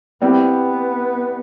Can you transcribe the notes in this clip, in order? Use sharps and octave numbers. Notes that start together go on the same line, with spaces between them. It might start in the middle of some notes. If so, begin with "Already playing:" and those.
G3 B3 C4 E4 G4